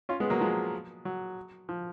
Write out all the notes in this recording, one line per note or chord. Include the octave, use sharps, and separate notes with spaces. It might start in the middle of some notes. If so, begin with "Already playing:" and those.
C#4 F4
G#3 B3
F#3 A#3
F3 G#3
F#3
F3